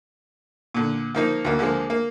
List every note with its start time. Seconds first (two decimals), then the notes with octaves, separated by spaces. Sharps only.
0.74 A#2 D3
1.15 F3 A#3 D#4
1.45 D2 A#3
1.59 D3 F3 G#3 A#3
1.90 A#3